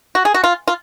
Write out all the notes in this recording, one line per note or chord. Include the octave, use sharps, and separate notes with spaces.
F#4
G#4
F#4
F4
F4